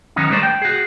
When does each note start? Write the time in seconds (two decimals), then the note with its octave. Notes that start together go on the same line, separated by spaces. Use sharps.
0.16 D#3 F#3 B3 C#4 D#4
0.30 G3 A3 A#4 C5 D5
0.43 G5
0.62 F#4 G#4